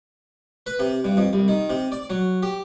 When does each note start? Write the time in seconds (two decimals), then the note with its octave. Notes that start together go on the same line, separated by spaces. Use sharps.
0.66 B4
0.79 C3
1.04 G2
1.17 F2
1.33 C2
1.48 D#3
1.70 C3
1.92 D5
2.10 F#3
2.43 G4